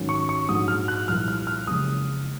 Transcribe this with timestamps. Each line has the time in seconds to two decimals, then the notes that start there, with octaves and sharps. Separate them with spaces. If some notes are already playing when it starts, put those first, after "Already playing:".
Already playing: G#2 D#3 F#3 C#4
0.09 C#6
0.29 C#6
0.49 A#1 G#2 F#3 D#6
0.68 F6
0.88 F#6
1.08 C2 A#2 F3 A#3 F6
1.28 F6
1.47 F6
1.67 F#1 F2 C#3 G#3 D#6